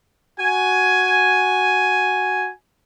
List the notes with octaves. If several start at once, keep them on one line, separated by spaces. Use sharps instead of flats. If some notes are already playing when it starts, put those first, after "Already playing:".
F#4 G#5